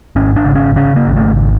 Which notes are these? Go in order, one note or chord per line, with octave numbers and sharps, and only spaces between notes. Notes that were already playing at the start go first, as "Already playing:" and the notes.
G#1 C#4
D4
C#3
C#4
C#3 C#4
A#3
G#1
A3